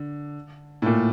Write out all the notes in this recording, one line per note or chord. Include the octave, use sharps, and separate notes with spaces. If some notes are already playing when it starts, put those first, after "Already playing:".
Already playing: D3
A2
A#2